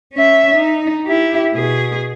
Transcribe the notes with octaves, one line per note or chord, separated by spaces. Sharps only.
C#4 E5
D#4
E4 G4
B2 G#4